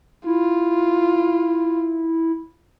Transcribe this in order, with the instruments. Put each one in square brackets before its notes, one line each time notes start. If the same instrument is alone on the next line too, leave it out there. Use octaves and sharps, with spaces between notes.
[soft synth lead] E4 [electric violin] F4